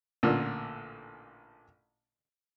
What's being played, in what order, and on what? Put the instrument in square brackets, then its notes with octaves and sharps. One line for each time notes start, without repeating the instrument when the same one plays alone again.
[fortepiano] A1 A#2 D3